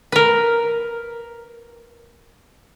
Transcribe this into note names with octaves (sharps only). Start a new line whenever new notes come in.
A#4 B4